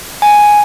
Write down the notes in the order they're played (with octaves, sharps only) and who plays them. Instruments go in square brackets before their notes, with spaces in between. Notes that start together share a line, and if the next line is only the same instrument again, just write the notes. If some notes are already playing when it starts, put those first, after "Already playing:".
[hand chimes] G#5